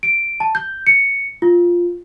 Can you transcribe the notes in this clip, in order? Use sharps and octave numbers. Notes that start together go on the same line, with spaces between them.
D7
A5
G6
C#7
F4